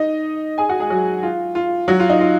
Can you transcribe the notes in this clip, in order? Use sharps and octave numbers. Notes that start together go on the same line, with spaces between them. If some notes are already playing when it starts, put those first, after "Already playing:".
Already playing: D#4 D#5
G#4 G#5
F#4 F#5
G#3 G#4
F#3 F#4
F4
F4
F#3 F#4
F4
D#4
F4